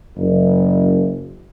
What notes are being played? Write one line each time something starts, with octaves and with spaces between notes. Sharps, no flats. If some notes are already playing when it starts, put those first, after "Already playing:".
F#1